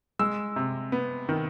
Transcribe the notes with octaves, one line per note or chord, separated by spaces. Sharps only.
G#3 E6
C3
B3
D#3